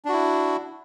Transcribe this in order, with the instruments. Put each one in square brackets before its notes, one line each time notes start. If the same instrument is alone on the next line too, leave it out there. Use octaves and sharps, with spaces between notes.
[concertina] D4
F#4
E4